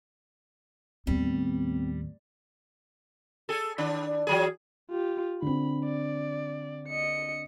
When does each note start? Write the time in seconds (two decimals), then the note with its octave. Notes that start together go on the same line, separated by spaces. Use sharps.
1.07 D#2 A2 G3 B3 C4
3.49 G#4 A4
3.78 D#3 D4
4.27 E3 F#3 G#4
4.90 F4 G4
5.42 D3 C4 B5
5.85 D5
6.88 D#5 C#7